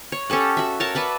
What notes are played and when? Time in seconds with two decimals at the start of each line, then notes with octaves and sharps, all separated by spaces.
0.12 C#5
0.30 C#4 G4 A4 F#5
0.57 F#4 E5
0.80 A#4 C#5 A5
0.95 B4 D5 E5 F#5